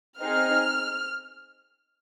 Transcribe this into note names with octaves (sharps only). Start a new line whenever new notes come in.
C4 D#4 G#4 F6